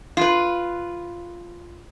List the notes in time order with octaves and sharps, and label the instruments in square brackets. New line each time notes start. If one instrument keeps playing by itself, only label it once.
[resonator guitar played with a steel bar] F4 B4